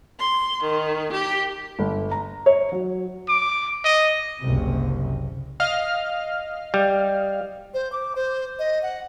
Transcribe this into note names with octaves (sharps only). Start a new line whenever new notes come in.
C6
D#3
G4
G1
A#5
C#5
F#3
D6
D#5
F#1 C2 C3
D#5 F5 F6
G3
C5
D6
C5
D#5
F#5